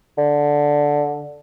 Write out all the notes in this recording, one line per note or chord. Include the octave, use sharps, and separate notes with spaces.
D3